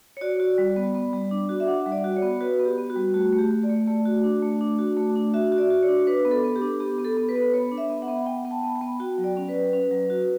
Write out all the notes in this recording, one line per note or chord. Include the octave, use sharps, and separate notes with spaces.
C#5
F#4 D5
F#4
G3
B3
B3
G3
D4
F#4
E5
D4 F#5
G3
D5
F#4
C#5
B3
F#4 B4
B3
G4
B3
F#4
G3
A3 F#4
A3
G4
A3
D5
A3
A3
F#4
D4
A3
D4
F#4
A3
D4
F#4 E5
F#4
D5
F#4
C#5
D4
D4 B4
B3
A4
B3
G4
D4
B3 G4
B3
A4
B3
B4
B3
B3 C#5
D4
E5
B3
F#5
B3
B3 G5
B3
A5
B3
G5
B3
F#4 G5
F#3
D5
C#4
B4
F#3
C#4
F#3
F#4